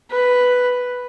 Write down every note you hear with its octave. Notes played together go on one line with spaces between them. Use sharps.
B4